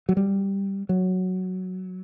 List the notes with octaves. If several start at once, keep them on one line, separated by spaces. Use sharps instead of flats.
F#3
G3
F#3